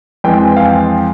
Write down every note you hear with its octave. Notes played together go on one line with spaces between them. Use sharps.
F2 E3 G#3 G5
F5
G5